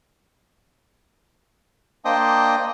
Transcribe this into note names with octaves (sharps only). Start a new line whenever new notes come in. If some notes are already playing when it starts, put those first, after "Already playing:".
A#3 D4 C5 D#5 G5 D#6